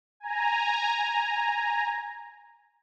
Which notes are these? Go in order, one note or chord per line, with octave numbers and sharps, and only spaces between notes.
G#5 A#5